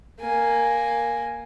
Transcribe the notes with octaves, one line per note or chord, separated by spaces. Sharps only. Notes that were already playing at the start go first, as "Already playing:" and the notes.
A#3 G#5